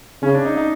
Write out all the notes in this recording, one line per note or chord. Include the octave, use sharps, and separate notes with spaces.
C#3 C#4
D4
D#4
D#4